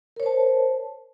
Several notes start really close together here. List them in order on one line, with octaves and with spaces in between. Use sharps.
A#4 C#5 C5 A5